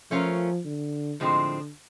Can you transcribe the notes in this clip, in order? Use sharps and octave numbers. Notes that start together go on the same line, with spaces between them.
F3 A3 C#4 F4 A#4
D3
A2 D3 F3 G#3 C4